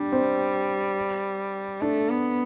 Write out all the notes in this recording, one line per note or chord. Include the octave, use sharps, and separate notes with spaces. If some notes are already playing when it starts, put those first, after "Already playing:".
Already playing: G3 D4
C4
A3 D4
B3